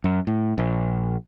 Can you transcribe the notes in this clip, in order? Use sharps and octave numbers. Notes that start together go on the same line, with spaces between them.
F#2
A2
A#1